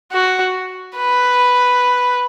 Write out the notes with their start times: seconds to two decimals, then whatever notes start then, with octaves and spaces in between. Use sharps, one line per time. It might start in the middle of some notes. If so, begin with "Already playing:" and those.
0.12 F#4
0.97 B4